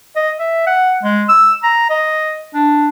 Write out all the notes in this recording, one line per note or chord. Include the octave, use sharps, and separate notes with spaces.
D#5
E5
F#5
G#3
E6
A#5
D#5
D4